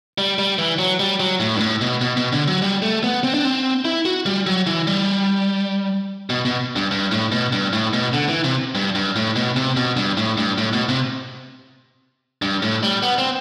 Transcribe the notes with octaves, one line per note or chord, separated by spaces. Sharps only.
G3
G3
E3
F#3
G3
F#3
A2
G2
A2
B2
B2
B2
D3
F#3
G3
A3
B3
C4
D4
C4
E4
F#4
G3
F#3
E3
G3
B2
B2
G2
G2
A2
B2
G2
A2
B2
D3
E3
C3
G2
G2
A2
B2
C3
B2
G2
A2
G2
A2
B2
C3
G2
A2
G3
B3
C4